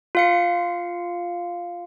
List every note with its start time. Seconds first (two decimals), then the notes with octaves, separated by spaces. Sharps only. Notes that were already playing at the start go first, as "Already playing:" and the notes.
0.15 F4 F5 C#7